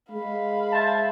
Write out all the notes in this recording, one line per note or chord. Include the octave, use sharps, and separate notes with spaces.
G#3 F5 B5
C5 E5 A5